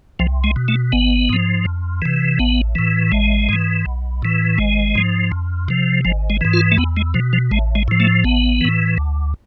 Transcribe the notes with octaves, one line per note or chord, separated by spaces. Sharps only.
C2 F3
G#3
B2
A3
G#1 B3
G#2 F3
F2
C3 E3
A1 B3
A2 E3
A1 G#3
G#2 E3
B1
A2 E3
G#1 G#3
G#2 F3
F2
C3 F3
G#1 F3
G#3
G#2 E3
F4
A3
E2 B3
G#3
B2 F3
F3
A1 G#3
G#3
A2 F3
A3
A1 B3
A2 E3
D2